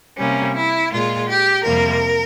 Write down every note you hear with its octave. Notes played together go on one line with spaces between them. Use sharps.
C3 G3 A#3 C#4
E4
A#2 G#3 F4
G4
F2 C3 G3 A#3 A#4